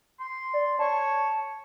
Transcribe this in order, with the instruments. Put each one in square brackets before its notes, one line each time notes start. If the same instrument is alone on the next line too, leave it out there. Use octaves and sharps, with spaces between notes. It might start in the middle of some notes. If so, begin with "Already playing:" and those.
[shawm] C6
[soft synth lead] D5
[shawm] C#5 [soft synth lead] A5